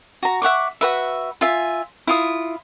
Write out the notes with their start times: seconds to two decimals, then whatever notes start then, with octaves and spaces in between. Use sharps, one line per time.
0.23 F#4 A#5
0.42 E5 F#5 C#6 D6
0.81 F#4 B4 E5
1.41 F4 E5 G#5
2.07 E4 F4 D#6